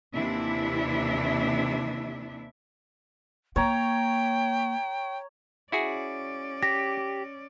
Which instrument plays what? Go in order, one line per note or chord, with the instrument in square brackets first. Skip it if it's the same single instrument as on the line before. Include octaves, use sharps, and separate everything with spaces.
[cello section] D#2 C3 E3 D4 E4 E5
[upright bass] A#3 [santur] C#5 A#5 [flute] G5
[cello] C#4 D5 [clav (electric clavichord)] E4 F#4 G#4
[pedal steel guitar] G4 [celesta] A#6